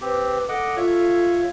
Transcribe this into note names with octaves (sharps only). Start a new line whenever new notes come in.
C4 G4 B4
A4 D#5 F#5 D6
F4 C#5 E5